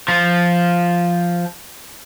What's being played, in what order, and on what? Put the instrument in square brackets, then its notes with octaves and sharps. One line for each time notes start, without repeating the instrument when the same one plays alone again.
[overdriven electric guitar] F3